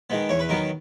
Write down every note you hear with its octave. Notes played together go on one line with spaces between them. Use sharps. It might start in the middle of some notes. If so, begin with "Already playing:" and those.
D#3 G#3 B3
E2 C#5
B4
D#3 F#3 B3 A#4